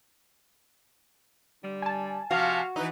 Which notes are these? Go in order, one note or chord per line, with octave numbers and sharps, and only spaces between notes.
D3 G3
G#5 A5
C3 F3 F#4 F5
E3 D#4 E4 B4